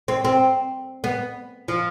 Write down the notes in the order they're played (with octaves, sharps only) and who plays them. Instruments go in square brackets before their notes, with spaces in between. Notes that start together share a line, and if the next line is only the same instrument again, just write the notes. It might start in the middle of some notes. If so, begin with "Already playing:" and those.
[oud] C4
C4
B3
F3